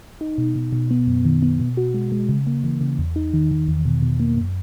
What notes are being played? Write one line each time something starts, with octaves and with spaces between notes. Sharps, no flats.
D#4
B2
B2
B2
B3
F#2
D#3
B3
B2
F#4
G#3
G#3
C#3
A#3
E3
C#3
E2
D#4
D#3
D#3
E2
B2
B2
A#3
F#2